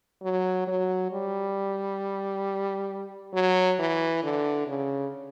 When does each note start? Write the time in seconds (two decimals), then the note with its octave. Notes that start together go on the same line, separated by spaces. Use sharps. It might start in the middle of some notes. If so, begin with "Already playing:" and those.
0.23 F#3
0.67 F#3
1.12 G3
3.34 F#3
3.79 E3
4.23 D3
4.68 C#3